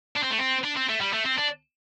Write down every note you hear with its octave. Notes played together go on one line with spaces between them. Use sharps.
D4
C4
A3
C4
D4
C4
A3
G3
A3
C4
D4